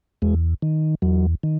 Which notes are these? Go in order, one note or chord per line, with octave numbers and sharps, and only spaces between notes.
E2 G#3
D#3
E2 F#3
D#3